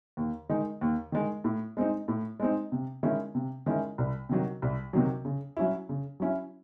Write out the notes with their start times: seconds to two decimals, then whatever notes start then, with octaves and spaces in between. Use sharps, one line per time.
0.17 D#2
0.49 D#3 G#3 D#4
0.81 D#2
1.12 D#3 G#3 D#4
1.44 A2
1.77 G#3 C4 D#4
2.08 A2
2.40 G#3 C4 D#4
2.72 C3
3.03 D#3 G#3 C#4 E4
3.35 C3
3.66 D#3 G#3 C#4 E4
3.98 C2
4.29 C3 D#3 F#3
4.62 C2
4.93 C3 D#3 F#3
5.25 C#3
5.57 F#3 C#4 E4
5.89 C#3
6.20 F#3 C#4 E4